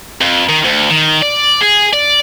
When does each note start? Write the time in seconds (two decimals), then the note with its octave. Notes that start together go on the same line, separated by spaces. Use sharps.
0.21 F2
0.49 D#3
0.65 D2
0.90 D#3
1.22 D5
1.61 G#4
1.93 D5